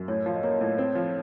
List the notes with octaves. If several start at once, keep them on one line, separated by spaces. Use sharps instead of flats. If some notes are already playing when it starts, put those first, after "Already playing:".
Already playing: F#2
A2 C#5
F3
D#5
A#3 C#5
A2
C4 C#5
F3